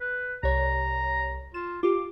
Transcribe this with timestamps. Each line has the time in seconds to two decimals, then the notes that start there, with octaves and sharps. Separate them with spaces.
0.01 B4
0.43 C2 C#5 A#5
1.54 F4 E7
1.83 F4 G4 D6